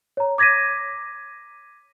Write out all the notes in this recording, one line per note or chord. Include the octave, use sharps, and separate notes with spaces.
C#5 A#5
D6 G#6 A#6 B6 D#7